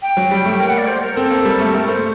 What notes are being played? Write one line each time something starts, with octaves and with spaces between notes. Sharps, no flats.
G5
F#3
G3
A3
A#3 G5
F#5
D5
C5
A#4
C4 A4
A#3
G3
A3 A4
A3 A#4
A3 C5